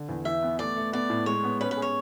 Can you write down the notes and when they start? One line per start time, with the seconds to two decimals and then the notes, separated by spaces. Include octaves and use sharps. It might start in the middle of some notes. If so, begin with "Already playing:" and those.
Already playing: D3
0.09 E2
0.25 E3 E5
0.43 B3
0.59 A3 D5
0.76 A3
0.93 B3 D5
1.10 A2
1.26 G#3 C#5
1.43 B3
1.61 C#4 B4
1.71 B4
1.77 G#4
1.82 C#5